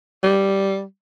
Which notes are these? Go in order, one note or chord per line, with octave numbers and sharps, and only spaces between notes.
G3